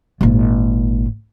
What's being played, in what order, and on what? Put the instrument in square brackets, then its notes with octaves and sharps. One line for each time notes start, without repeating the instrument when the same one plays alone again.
[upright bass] G#1 A#2